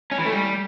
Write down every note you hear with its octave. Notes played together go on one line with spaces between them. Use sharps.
C#4
E3
A3
G3